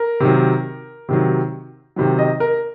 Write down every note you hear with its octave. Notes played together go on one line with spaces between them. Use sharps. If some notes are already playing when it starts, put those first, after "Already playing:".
Already playing: A#4
C3 D#3 F#3
C3 D#3 F#3
C3 D#3 F#3
D#5
A#4